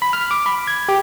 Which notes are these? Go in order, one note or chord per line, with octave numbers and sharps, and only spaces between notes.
B5
F6
D6
B5
G#6
G4